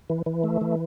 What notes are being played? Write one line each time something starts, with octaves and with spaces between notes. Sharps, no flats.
E3
E3
A3
E3